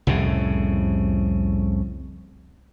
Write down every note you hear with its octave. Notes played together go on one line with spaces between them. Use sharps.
C2 F2 A2 C#3